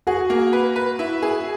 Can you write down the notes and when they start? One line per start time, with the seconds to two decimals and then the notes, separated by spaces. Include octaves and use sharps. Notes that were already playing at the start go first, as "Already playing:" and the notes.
0.07 F#4 G#4
0.30 A#3
0.53 B4
0.76 B4
0.99 E4
1.22 G#4